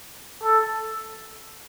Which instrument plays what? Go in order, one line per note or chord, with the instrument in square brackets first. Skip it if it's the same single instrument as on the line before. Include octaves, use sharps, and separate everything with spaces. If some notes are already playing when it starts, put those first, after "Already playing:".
[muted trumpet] A4